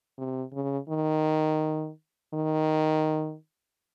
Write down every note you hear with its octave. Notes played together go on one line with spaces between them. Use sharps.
C3
C#3
D#3
D#3